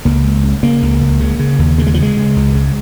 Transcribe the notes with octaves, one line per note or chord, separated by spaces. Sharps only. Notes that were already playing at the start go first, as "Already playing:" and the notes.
C#2 A#3
C#2
C#3
C#3 A#3
C#2
C#2
C#3
C#3
D#2
C#3 A#3
G#3
F3
C#3
G#3
C#3
C#2
C#3